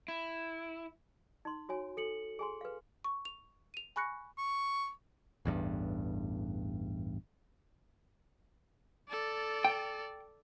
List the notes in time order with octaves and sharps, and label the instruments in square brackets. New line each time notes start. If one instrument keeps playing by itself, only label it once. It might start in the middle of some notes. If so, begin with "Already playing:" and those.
[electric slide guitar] E4
[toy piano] D#4 C6
F#4 C#5 G#5
[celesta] A4 C#7 F#7
[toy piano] G#4 G#5 C6
B4 F5
[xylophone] C#6
F7
D#7 F7
G#5 B5 C#6 F#6 A#6 C#7
[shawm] C#6
[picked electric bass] A1 E2 G2
[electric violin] A4 D5
[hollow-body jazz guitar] G5